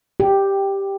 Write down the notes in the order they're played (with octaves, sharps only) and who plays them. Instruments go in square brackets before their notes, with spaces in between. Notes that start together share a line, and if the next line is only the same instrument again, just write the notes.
[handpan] G4